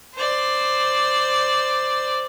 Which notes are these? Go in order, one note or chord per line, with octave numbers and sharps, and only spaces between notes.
C5 D5